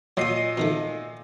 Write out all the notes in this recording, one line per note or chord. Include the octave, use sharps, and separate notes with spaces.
A#2 F#3 D#5 D#6 C7
B2 D#3 A3